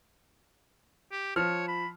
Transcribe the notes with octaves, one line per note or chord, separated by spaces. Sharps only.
G4
F3 C#5 F6
B5